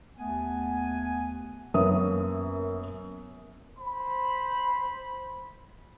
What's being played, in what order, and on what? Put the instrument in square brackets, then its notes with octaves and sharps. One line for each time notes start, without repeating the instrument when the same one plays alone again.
[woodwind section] D#2 A3 B3 F#5 G#5
[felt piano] F#2 A#3 B3 C#5 E5 D#6
[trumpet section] C5 B5